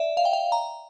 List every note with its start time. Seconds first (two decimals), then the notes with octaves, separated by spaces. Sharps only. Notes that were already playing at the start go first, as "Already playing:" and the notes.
Already playing: D5 E5
0.17 F5
0.25 G5
0.33 F5
0.52 A#5